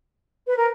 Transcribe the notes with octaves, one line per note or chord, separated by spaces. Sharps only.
B4
A#4